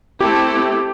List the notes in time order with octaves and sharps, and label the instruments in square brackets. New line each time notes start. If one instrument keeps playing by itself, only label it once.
[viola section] A3 C4 E4 A4 [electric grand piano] G4